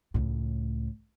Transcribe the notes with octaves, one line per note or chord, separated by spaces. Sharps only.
C#2 A2